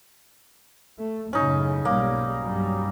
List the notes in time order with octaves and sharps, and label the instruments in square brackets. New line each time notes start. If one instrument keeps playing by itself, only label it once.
[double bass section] A3
[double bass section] F#2 A2 C#3 [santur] C#4 D#4
[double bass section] B1 G#2 G3 [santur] A#3
[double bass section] G2 F#3 G3